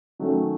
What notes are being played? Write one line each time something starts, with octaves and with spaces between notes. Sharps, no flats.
D#3 F#3 A3 C#4